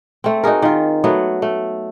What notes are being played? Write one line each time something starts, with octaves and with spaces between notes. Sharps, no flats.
A3 C4
D#4 F#4 G#4 A#4
D#3 F4
F#3 A3 B3
A3